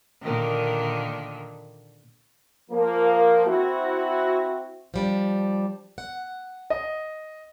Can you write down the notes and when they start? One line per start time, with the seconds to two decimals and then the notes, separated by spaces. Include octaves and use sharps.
0.22 A#2 D3 D#3
2.71 F3 A#3
3.47 C4 E4 F#4
4.94 F3 G3 D4
5.98 F#5
6.70 D#5